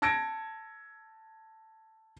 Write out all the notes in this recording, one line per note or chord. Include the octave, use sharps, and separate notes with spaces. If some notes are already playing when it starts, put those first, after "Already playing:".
A5 E6 G#6 A#6 C#7 D7